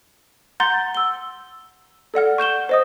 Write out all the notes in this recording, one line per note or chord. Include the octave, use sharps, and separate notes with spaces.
F#5 A#5 C6 G6 A6 G7
E6 G7
A4 D5 F#5 F6
C#6 G6 E7 G7
C5 D#5 D#6